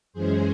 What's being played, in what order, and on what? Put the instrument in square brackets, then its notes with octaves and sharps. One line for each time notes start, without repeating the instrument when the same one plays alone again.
[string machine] F#2 E3 G#3 C#4 G#4 C5